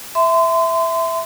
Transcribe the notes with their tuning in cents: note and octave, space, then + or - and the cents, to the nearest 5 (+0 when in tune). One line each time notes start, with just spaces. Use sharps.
E5 +0 C6 -30